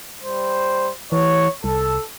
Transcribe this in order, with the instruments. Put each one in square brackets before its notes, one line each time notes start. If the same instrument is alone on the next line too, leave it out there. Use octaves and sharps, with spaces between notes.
[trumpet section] G3 C5
[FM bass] E3 [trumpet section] C#5
[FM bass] C2 [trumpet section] A4